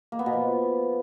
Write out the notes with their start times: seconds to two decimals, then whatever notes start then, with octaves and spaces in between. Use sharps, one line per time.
0.12 A#3
0.19 B3
0.26 B2
0.33 F3